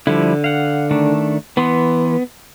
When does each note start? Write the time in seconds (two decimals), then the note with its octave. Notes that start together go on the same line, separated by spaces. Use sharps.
0.07 D3 F3 G3 E4
0.44 F5 F#5
0.91 D#3 A3 D4
1.57 E3 B3 C6